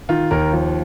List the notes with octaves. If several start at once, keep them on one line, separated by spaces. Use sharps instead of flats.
D#3 F4
D#2 A#4
F3